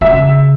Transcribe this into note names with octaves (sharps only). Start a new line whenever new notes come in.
C#3 E5